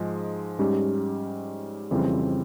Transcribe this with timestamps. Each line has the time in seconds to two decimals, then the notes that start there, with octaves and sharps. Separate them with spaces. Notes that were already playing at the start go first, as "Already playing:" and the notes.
Already playing: G#2 F3 G#3
0.59 G#2 G3 C#4 G4
1.91 F2 C#3 E3 G3 C4